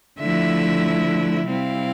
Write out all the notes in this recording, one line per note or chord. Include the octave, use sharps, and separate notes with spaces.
D3 F3 A3 E4 E5
C3 G3 C4 E4 F5